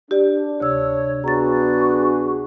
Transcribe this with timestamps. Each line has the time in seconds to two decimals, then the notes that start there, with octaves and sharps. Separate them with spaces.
0.11 D4 G4 D5
0.60 D2 C3 C#5 E6
1.24 B3 D4 F#4 G#4 A#5 A6